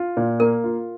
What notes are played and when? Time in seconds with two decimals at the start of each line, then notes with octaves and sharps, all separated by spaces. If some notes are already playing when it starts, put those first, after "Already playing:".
Already playing: F4
0.17 A#2
0.40 A#3 A#4
0.64 F4